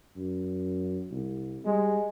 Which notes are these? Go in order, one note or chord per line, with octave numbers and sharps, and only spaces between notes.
F#2
C2
G3 G#3